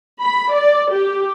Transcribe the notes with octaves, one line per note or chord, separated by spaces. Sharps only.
B5
D5
G4